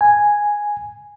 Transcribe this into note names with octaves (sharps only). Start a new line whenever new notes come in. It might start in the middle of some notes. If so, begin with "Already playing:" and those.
G#5